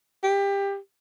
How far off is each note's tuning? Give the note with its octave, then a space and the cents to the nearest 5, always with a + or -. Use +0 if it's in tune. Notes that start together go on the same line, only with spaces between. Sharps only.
G4 +20